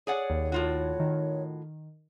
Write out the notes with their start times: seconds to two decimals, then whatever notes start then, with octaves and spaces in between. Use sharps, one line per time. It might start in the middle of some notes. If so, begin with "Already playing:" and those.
0.07 G#4 C#5 D5 F#5
0.30 D#2
0.52 A2 F4 F#4
1.00 D#3